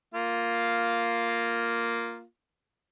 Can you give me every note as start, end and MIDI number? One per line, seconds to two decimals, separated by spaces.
0.14 2.23 58
0.14 2.23 65